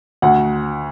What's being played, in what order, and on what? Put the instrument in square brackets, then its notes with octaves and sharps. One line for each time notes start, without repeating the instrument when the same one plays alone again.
[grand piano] D2 F#5